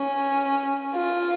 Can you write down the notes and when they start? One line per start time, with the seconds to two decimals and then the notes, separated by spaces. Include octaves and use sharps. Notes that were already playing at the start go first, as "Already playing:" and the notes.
Already playing: C#4
0.95 F4